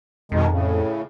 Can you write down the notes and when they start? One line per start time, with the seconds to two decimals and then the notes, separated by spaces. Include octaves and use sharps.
0.32 F2 B2 D#3 G#3
0.50 A2 C#3